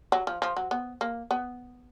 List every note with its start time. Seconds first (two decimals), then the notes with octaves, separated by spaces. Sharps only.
0.12 F#3
0.27 F3
0.42 F3
0.57 F#3
0.71 B3
1.01 A#3
1.31 B3